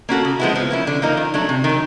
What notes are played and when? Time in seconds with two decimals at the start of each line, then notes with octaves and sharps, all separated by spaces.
0.09 A#3 C#4 F#4 A4
0.25 C#3
0.40 F3 G#3 B3 E4
0.56 F3
0.70 A#3 C#4 E4
0.87 D3
1.02 F3 A#3 D#4
1.17 D#3
1.34 F#3 A3 D4
1.49 C3
1.64 D#3
1.69 F#3